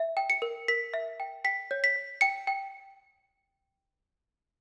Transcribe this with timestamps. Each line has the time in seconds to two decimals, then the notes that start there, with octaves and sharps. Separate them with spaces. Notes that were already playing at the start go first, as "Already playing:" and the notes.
Already playing: E5
0.17 G5
0.30 C#7
0.42 A#4
0.68 A#4 B6
0.94 E5
1.20 G5
1.44 G5 B6
1.71 C#5
1.84 B6
1.96 C#5
2.21 G5 C#7
2.47 G5